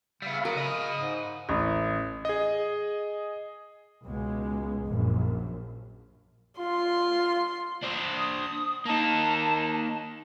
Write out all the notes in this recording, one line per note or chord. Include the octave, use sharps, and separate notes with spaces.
C#3 G3 B3 E5 F5 B5
F#3 A#4 D#6
C#3 D#5 B5
G#2
A1
G#4 D#5
C#2 B2 G#3
A#1 F#2
F4 C6
D4 C5
D#6
A#3 D#4 A5